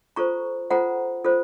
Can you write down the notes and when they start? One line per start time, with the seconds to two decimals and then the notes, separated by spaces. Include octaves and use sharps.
0.16 F4 A4 C5 A#5 C#6
0.70 F4 A4 C5 F#5 A#5
1.25 F4 A4 C5